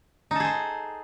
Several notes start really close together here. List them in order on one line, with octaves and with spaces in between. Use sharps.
D#4 A4 G#4 C5